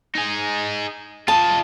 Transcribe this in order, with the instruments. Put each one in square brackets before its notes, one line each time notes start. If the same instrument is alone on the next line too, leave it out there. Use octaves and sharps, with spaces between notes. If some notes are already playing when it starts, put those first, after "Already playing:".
[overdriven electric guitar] D#4 G#4
[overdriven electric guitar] F4 D#5 [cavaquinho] A5